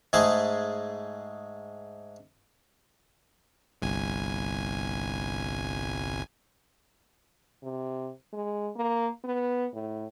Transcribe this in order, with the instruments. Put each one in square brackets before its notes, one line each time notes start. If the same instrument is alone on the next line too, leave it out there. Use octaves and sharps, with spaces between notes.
[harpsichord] G#2 G#3 A3 G#4 A5
[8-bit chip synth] G1 C2 G#5
[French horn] C3
G#3
A#3
B3
A2